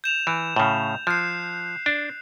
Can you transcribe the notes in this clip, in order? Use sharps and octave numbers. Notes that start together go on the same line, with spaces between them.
G6 E7 F7
E3
A2 C#3
F3 F#6 C7
D4